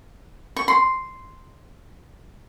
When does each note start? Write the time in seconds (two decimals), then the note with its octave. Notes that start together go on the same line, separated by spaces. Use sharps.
0.56 C#6
0.68 C6